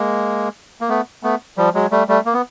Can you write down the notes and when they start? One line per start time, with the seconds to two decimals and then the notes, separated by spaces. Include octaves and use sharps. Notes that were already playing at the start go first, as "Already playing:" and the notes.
Already playing: G#3 A#3
0.81 A#3
0.89 A3 B3
1.23 A3 B3
1.57 F3 G3
1.75 F#3 G#3
1.91 G3 A3
2.08 G3 A3
2.26 A#3
2.34 B3